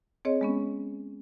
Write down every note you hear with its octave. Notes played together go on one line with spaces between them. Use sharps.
C4 G#4 C#5 D#5
G#3 B3 C#4